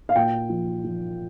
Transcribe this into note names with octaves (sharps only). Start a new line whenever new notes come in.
F5
A#2 G5
F3
F3